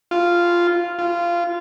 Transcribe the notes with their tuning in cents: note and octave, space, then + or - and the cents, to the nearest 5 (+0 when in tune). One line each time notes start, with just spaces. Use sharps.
F4 -5
F4 -15